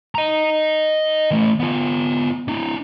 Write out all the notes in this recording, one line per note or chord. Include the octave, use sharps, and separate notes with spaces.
D#5 A#5
E3 A3
B3 F4
D4 E4